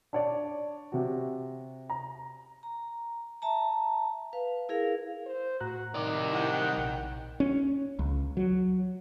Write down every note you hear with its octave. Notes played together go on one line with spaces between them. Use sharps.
D4 C#5 D5
C3 F#4
A#5
A#5
E5 A5 A#5
B4 F5
E4 G#4 A#4 F5
C5
A2 F#4 A#5 F#6
C3 D#3 D5
E4 F#5 G5
A#1
C#4
C#2
F#3